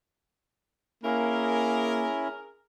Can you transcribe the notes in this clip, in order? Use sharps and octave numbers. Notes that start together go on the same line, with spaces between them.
A#3 C#4 E4 G#4 A#4